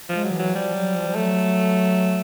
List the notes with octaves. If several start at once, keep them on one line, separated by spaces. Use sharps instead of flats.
F3 G#3
F#3
D#3
E3
F#3
F3 G3
F#3
F3
F3
F#3 A3